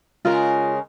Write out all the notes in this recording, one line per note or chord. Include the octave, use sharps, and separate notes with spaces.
C#3 G#3 F4 A#4